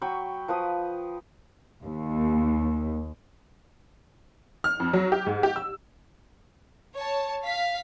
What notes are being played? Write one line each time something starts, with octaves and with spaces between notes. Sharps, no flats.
F#3 G5 B5 C#6
F3 B4 D#6
D#2
F6
F2
F#3
G4
G#2
G4
E6
C#5 A5
F5 B6